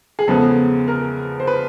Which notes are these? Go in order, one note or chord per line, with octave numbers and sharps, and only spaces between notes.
G#4
E2 C#3 F3 G#3 B3 A4
A#4
C5
B4